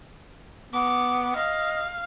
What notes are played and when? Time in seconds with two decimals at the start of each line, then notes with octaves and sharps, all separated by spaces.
0.73 B3 D6
1.36 D#5 F5